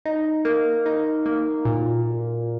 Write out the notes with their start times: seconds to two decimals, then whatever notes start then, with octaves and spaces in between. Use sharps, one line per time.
0.05 D#4
0.45 A#3
0.86 D#4
1.26 A#3
1.65 A#2